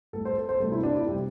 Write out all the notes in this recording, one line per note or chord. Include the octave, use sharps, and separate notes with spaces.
A2 G3 A4
C5
A4
C5
D2 C3 G3 A4
E4
D4
E4
C3 G3 G4